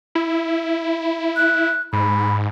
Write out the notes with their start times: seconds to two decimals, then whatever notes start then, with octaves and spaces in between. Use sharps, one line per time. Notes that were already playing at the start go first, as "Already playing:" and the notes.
0.15 E4
1.36 F#6
1.93 G#2 B5